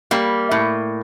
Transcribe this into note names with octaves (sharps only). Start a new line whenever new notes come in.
G3 A#3
A2